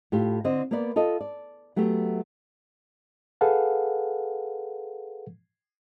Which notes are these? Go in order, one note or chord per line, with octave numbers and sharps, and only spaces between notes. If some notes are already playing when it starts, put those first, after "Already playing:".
A2 F4 G4
D3 C4 D#5
A#3 B3 A#4 B4 D5
F4 A4 D#5
D5
F#3 A3 B3 G4
G#4 A4 B4 F5 F#5